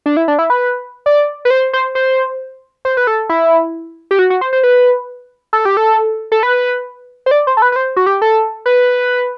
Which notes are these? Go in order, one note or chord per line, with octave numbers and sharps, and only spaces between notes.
D4
E4
D4
E4
B4
D5
B4
C5
C5
C5
C5
B4
A4
E4
G4
F#4
F#4
C5
C5
B4
A4
G4
A4
A4
B4
C5
D5
C5
A4
B4
B4
C5
F#4
G4
A4
B4